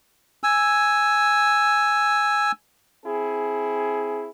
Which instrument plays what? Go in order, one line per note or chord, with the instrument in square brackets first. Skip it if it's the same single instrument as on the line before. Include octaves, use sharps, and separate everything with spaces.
[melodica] G#5 E6
[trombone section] C4 E4 G#4